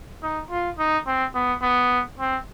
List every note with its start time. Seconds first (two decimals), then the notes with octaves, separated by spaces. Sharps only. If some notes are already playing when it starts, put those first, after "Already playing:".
0.23 D#4
0.50 F4
0.78 D#4
1.06 C4
1.35 B3
1.62 B3
2.19 C4